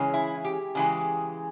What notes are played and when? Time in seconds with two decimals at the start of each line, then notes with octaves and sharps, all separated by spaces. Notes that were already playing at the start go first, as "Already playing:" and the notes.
Already playing: C#3 E3 G#3 C#4
0.14 E4
0.45 G4
0.75 C#3 E3 G#3